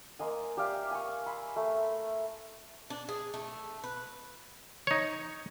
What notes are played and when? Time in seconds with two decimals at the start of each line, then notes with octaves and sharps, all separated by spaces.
0.19 A#3 C5 D#5 G#5
0.57 G4 D5 E5 F5
0.91 G#5 C#6
1.26 G#5 B5 C6 E6
1.56 A3
2.90 D4
3.09 G#4
3.34 A3
3.84 B4
4.87 D#4 C#5